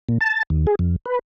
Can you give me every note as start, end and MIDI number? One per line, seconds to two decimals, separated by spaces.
0.09 0.18 46
0.21 0.43 81
0.50 0.66 39
0.67 0.75 68
0.79 0.96 41
1.06 1.19 71